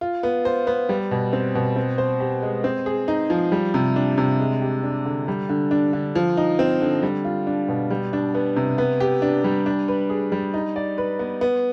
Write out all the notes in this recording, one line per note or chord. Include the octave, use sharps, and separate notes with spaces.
F4
B3
C5
B3
G3
B2
C4
B2
C4
C5
G4
G#3
C4
G#4
D#4
F3
G3
C3
D4
C3
G#3
G4
D4
D3
G3
D3
D4
D3
F3
D#4
C4
D3
G3
F4
D4
B2
G3
D4
B3
C3
B3
G4
D4
G3
D4
B4
G#4
G3
D#4
D5
B4
B3
B3